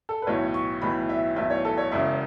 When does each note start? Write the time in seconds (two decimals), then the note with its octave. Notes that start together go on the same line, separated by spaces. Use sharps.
0.09 A4
0.22 B4
0.27 B1 A2 E3 C#5
0.54 C#6
0.82 B1 A2 E3 B5
1.09 E5
1.36 B1 A2 E3 E5
1.50 C#5
1.65 A4
1.77 C#5
1.91 E1 E2 C#3 E5